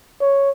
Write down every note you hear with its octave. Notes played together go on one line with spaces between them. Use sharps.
C#5